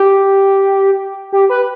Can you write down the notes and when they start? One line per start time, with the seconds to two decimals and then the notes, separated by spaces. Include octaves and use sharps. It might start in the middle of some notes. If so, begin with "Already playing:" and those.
Already playing: G4
1.32 G4
1.49 B4